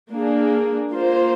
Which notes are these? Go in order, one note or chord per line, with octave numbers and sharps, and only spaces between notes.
A#3 D4 G#4
A#3 F4 C5